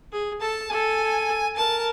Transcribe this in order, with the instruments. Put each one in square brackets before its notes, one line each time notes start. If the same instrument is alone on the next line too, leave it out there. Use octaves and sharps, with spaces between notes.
[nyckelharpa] G#4
[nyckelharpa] A4 [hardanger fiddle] A5
[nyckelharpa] A4 [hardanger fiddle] G#5
[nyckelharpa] A#4 [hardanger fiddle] A5